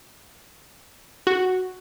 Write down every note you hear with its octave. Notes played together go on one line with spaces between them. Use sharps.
F#4